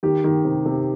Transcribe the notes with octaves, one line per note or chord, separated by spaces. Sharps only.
D#3 G4
D#3
C3
C3